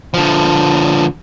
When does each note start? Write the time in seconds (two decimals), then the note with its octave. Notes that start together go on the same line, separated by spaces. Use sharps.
0.14 D3 F3